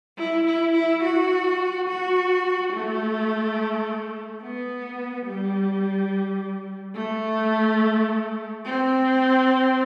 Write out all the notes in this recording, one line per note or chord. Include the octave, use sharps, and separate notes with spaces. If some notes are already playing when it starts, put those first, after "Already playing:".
E4
E4
E4
F#4
F#4
A3
B3
G3
A3
C4